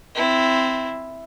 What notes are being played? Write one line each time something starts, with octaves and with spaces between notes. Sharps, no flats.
C4 E4